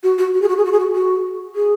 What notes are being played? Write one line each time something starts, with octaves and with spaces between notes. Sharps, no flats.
F#4
F#4
F#4
G#4
F#4
G#4
F#4
G#4
F#4
F#4
G#4